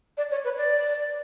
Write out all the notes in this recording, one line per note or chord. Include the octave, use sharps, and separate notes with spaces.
D5
C#5
B4
D5